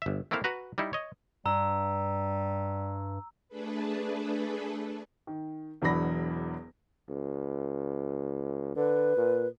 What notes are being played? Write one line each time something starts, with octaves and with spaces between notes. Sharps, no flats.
G1 E5
A3 A#3 C4 E4 F5
F#4 B4 A#5
G3 D#4 E4
C#5 D#5
G2 G3 A#5 E6
A3 D4 G#4 A4 B4
D#3
E1 E2 F#3 D4 B5 A#6
C#2
D3 B4
A#2